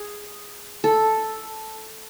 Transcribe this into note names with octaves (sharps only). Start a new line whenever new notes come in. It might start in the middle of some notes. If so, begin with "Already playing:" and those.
Already playing: G#4
A4